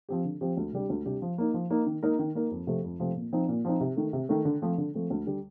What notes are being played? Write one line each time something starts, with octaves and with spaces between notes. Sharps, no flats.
F3 C4 G4
D3
F3 C4 G4
D2
C3 G3 D4 G4
D2
C3 G3 D4 G4
F3
A#3 D#4
F3
A#3 D#4
D#3
A#3 D#4 A#4
D#3
A#3 D#4 A#4
F2
C3 F3 A3 C4
F2
C3 F3 A3 C4
A#2
F3 C4 D#4
A#2
F3 C4 D#4
C3
D#3 A3
C3
D#3 A3
D3
F3 A3 C4
D3
F3 A3 C4
D2
D3 G3